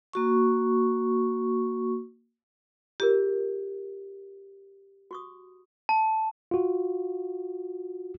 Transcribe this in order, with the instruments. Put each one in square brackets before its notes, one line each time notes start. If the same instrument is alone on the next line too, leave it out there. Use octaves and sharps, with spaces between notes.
[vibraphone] A#3 F#4 C#6
[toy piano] F4 G#4 A#4 [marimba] G4
[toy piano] F#4 C#6 D#6
[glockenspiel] A5
[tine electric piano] F4 F#4